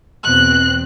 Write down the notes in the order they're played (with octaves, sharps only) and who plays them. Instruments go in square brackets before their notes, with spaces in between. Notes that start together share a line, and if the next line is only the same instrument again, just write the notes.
[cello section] E2 B2 C4 [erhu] F#6